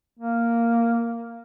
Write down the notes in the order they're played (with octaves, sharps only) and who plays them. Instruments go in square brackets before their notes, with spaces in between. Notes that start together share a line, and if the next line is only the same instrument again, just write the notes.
[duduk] A#3